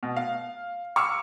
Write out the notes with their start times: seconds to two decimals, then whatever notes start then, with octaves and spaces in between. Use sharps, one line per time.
0.03 B2
0.17 F5
0.96 C#6 D6 E6 F6 C#7